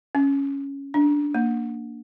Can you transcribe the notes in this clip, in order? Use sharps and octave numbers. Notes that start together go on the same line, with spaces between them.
C#4
D4
A#3